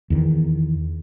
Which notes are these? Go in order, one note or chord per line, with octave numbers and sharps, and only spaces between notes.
E2 D#3